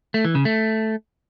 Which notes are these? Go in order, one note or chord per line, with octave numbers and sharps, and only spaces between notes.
A3
E3
C#3
A3